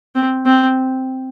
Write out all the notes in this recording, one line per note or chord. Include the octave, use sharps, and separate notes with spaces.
C4
C4